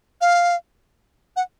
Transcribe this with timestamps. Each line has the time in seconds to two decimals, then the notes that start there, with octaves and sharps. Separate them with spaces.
0.21 F5
1.36 F#5